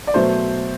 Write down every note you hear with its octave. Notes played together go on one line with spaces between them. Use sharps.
D5
B2 F#3 A3 C5